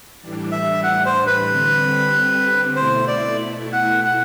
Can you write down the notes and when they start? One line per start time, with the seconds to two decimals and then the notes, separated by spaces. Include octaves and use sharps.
0.20 A2 E3 G3 D4
0.52 E5
0.84 F#5
1.06 C5
1.27 B4
1.49 D3 G3 C4
2.76 B2 A3 E4 C5
3.08 D5
3.73 F#5
4.05 F#5